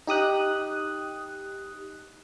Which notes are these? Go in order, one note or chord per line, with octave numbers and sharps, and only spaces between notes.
D#4 G4 D#6 F#6